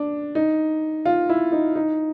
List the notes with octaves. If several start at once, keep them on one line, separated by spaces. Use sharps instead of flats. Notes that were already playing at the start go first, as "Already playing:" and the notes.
Already playing: D4
D#4
F4
E4
D#4
D#4